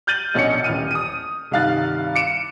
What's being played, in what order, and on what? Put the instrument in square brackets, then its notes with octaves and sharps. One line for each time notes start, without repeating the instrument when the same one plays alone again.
[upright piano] F6 G6 A6 D#7 F#7
A#1 B2 C#4 D4 D#5 C#7
D#1 A1 F6 D#7
D#6 D#7
C2 G2 D#3 F5 F#6 A6
D6 C#7 D7 E7